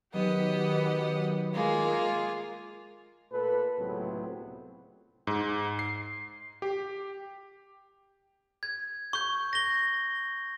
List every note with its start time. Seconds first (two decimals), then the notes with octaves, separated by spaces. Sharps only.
0.14 D#3 F#3 B3 G4 D#5 F#5
1.54 G#3 A#3 F4 G#4
3.31 A#2 A3 A4 B4
3.78 C#2 A2 C3 F#3 B3 C4
5.27 G#2
5.79 C7
6.62 G4
8.63 G#6
9.13 C#6 G6
9.53 A#6 G7